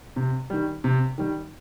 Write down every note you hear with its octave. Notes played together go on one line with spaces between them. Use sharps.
C3
D#3 G3
C3
D#3 G3